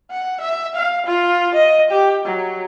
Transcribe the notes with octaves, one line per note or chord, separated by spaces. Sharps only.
F#5
E5
F5
F4
D#5
G4
F#3